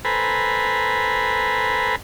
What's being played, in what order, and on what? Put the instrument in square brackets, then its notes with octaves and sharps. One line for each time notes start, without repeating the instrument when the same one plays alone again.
[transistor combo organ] A4 B4 C5 G#5 A#5 B5